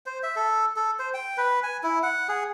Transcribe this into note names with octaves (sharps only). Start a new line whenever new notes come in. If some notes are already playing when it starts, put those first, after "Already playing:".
C5
E5
A4
A4
C5
G5
B4
G#5
E4
F#5
G#4